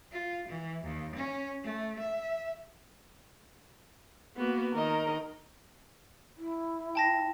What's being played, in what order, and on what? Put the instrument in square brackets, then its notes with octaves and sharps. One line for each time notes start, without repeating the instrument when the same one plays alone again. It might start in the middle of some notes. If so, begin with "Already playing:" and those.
[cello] F4
E3
D#2
C#4
A3
E5
[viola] A#3 B3 [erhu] F#4
[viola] D#3 D#5 [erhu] A#4
[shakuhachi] E4
[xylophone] G5 A5 A#6